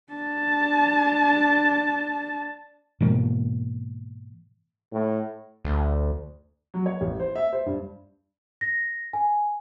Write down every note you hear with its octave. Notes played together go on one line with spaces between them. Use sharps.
D4 A5
G#2 B2 E3 A#3
A2
D2
F#3
C#5
A1
C5
E5
C5
G2
A#6
G#5